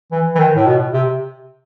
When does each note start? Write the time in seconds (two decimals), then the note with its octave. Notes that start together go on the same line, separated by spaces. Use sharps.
0.12 E3
0.35 E3
0.40 D#3
0.56 A2
0.67 B2
0.93 C3